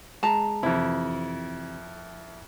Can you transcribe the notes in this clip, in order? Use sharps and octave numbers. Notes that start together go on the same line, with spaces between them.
G#3 A5 A#5
F2 C3 E3 E4